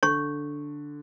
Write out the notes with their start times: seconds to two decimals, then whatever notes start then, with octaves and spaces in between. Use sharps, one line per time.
0.03 D3 C#5 C#6